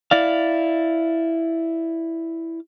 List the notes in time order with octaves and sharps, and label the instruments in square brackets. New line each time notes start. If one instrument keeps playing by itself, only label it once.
[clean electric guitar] E4 D5 F5